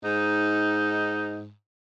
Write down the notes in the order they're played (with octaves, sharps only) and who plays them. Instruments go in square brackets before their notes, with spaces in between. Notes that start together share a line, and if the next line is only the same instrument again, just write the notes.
[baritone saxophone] G#2 [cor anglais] D#4